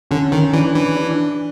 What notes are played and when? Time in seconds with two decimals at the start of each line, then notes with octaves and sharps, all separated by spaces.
0.11 D3 C#4
0.32 D#3
0.53 E3 D4
0.75 E3
0.95 D4